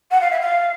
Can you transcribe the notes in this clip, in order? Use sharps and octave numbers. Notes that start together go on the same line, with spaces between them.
F#5
F5
E5
F5